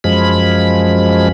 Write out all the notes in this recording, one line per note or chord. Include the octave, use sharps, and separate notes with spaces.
F#2 F3 G#3 B5